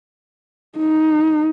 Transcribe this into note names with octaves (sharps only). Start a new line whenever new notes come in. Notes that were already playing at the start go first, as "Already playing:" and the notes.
D#4